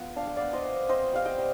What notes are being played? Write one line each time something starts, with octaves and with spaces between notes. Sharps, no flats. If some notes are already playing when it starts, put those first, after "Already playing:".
Already playing: B3 F4
D4 F5
G5
B3 D5 F5
C5 D#5
B3
C4 C5 D#5
G3 F5
D#5 G5
G3